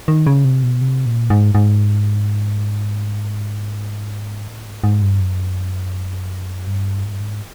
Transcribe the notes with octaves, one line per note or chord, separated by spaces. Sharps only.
D#3
C#3
C3
B2
C3
A#2
G#2
G#2
A2
G#2
G#2
G2
F#2
G2
G#2
G2
G#2